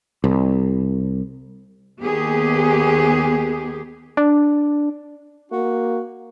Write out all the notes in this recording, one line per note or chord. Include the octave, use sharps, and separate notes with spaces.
C2
D#2 B3 G4 G#4
D4
A#3 F#4